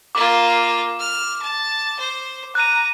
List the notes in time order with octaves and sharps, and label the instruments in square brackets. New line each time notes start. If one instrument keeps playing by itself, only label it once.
[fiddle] A#3 F4 [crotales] D6
[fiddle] F6
A5
C5
[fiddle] A#5 [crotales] F#6 D#7